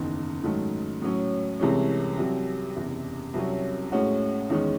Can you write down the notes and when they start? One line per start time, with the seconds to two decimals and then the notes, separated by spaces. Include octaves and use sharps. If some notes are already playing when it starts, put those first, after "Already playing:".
Already playing: F#1 E2 D#3
0.44 G#2 D#3 F#3 A3
1.02 A2 F#3 C#4
1.60 C2 C3 E3 G#3 C#4
2.17 C2 C3 F#3
2.76 F#1 E2 C3
3.34 C2 C3 F#3 C#4
3.92 A2 G#3 C#4 F#4
4.50 E2 D#3 G#3 C#4